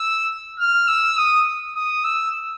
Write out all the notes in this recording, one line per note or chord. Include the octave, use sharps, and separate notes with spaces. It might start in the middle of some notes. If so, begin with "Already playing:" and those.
Already playing: E6
F6
E6
D#6
D#6
E6